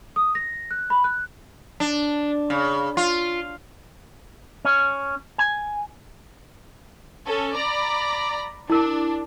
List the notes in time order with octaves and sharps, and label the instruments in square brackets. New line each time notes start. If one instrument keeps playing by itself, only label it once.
[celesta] D#6
A#6
F#6
B5
F#6
[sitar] D4
C#3
F4
[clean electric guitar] C#4
G#5
[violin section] C#4 A4
D5 A#5 B5
[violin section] D4 [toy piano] E4 A#4